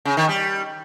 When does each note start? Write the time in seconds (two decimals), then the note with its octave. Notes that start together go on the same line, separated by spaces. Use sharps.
0.05 C#3
0.17 D#3
0.29 G3